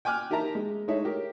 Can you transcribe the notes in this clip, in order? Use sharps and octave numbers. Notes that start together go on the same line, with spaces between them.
G5 G#5 D6 F6 F#6
D#4 G4 A#4 E5 A5 A#5
G#3
G#3 A3 D#4 G#4 C#5 E5
G4 A#4